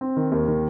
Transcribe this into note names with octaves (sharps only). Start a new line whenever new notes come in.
C4
D#3
D#2
D#3